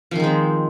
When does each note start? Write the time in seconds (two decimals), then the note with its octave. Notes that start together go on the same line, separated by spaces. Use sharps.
0.11 F3
0.15 D#3
0.20 G#3
0.24 C4